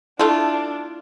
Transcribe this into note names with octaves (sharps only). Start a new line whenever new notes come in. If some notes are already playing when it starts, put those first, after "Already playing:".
A3 D4 E4 F4